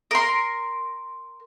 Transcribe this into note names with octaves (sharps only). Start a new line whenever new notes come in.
A#4 C6